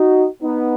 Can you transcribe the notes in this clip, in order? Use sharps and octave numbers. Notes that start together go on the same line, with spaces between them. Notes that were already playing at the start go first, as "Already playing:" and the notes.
Already playing: D#4 F#4
B3 D#4